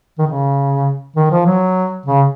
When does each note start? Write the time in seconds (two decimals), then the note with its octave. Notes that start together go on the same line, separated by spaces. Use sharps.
0.19 D#3
0.27 C#3
1.16 D#3
1.31 F3
1.46 F#3
2.06 C#3